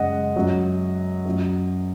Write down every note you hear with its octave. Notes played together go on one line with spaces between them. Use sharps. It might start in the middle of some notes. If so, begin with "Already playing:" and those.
Already playing: F#2 C#3 G#3 D#5 F#5
F#2 F#3
F#2 F#3